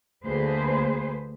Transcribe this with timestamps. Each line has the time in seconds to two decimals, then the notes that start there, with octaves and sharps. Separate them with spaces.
0.24 D2 A#3 G#4 B4 C5